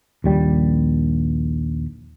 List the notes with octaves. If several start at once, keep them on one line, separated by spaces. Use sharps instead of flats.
A#1 D#2 G3